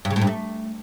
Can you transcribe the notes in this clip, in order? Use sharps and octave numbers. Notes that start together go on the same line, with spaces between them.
G2
C#3
A2
G2
A3